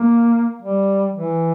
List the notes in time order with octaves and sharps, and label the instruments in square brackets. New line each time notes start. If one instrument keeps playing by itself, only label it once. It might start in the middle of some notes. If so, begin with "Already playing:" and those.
Already playing: [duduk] A#3
G3
E3